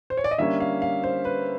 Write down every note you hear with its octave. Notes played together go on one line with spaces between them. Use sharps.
C5
C#5
D5
D#5
D3 G3 A#3 C#4 E5
F5
F5
C5
B4